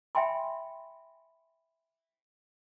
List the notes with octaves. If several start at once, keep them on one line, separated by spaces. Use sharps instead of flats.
E5 G5 G#5 B5 C6